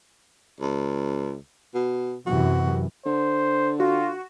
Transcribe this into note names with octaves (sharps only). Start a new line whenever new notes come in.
C#2
B2
F#2 C3 E3 F#4
D3 C5
F4 F#4